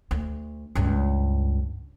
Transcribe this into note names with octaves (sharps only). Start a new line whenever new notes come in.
D2
C#2 G2